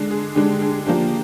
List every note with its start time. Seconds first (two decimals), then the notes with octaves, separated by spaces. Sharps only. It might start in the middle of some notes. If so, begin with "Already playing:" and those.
Already playing: D3 G#3 D4
0.11 G#4
0.35 D3 G#3 D4 G4
0.62 G#4
0.86 F3 A#3 D4 G4